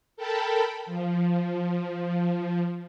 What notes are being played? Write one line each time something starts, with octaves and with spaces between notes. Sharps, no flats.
A4 A#4 G5 A5 B5
F3